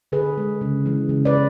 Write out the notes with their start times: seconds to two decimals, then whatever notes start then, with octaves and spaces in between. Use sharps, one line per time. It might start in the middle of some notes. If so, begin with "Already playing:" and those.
0.12 D3 G#4 B4
0.37 G#3
0.61 C#3
0.86 E3 G#3
1.09 C#3
1.25 B4 D5